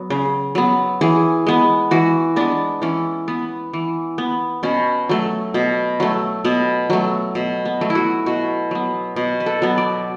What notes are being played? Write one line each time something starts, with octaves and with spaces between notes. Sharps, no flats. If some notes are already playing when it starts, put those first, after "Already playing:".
Already playing: F#3 B3
C#3
F#3 B3
E3 G#4
G#3 B3
E3 F#4
G#3 B3 D4
E3 C#4
B3
E3
B3
B2 C#4
F#3 A3
B2
F#3 A3
B2 B3
F#3 A3
B2
B3
F#3 A3
E4
F#4
B2 F#4
F#3 B3
B2
B4
A4
F#3 B3
D5